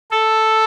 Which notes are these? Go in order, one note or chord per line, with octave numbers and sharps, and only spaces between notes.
A4